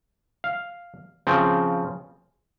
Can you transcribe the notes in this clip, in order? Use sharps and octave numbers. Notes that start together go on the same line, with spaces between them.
F5
C#3 F3 C4